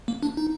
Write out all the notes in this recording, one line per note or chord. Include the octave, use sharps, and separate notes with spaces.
A#3
D4
D#4